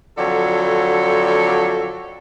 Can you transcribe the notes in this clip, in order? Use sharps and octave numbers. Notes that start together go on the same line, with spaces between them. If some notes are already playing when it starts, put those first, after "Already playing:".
F2 D3 F#3 A4